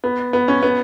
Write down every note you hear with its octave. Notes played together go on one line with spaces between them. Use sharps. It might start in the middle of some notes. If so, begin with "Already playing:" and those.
B3
B3
C#4
B3